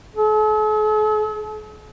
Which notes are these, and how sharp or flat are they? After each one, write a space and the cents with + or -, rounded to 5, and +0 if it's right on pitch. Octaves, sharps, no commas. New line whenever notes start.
A4 -45